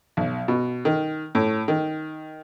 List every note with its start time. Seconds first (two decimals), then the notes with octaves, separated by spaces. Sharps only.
0.17 B1
0.48 B2
0.85 D#3
1.35 A2
1.68 D#3